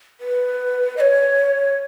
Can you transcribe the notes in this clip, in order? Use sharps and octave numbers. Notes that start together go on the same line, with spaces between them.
B4
D#5
C#5